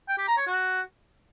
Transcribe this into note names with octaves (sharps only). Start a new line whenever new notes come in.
G5
G4
A#5
C#5
F#4